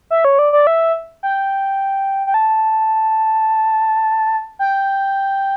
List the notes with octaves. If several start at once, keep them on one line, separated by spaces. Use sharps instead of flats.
E5
C#5
D5
D5
E5
G5
G5
A5
G5